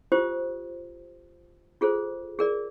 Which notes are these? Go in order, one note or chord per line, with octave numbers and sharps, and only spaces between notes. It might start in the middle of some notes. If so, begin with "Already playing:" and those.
F4 G4 C5 D#6
F4 G#4 A4 C5
G#4 A#4 D5